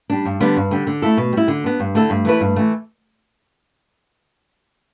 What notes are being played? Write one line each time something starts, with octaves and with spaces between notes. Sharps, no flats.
G3 D4
G2
D3 G3 B3 D4
G2
D3 G3
D3
A3 E4 A4
B2
G3 E4
D3
B3 D4
G2
D3 A3 E4 A4
G2
E3 A3 E4 B4
G2
E3 A3